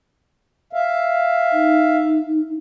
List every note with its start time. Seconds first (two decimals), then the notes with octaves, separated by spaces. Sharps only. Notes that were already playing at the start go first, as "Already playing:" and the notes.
0.73 E5 F5
1.53 D#4